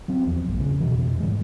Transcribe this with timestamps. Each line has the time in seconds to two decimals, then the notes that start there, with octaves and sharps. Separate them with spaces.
0.08 F#3 C4
0.26 E2 F3
0.48 A#1 G2 A3 B3
0.60 C#3
0.80 F1 C2 B2 E3
1.20 G#2 E3 G3 G#3